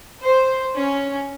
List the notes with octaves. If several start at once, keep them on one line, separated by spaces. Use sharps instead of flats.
C5
C#4